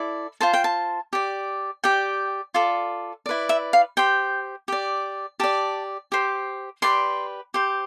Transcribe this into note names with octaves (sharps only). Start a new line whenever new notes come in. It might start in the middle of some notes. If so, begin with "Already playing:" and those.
Already playing: E4 A4 D5
F4 C5 A5
G5
A5
G4 D5
G4 D5 G5
F4 A4 D5
E4 B4 D5
E5
F5
G4 C5 G5
G4 D5
G4 D5 A5
G4 C5
G4 B4 D5 C6
G4 C5